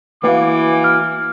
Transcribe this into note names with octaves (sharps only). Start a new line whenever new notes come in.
E3 A#3 E4 F#4 B4 F5 D6
F6